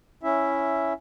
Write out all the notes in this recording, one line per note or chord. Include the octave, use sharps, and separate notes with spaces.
C#4 E4 E5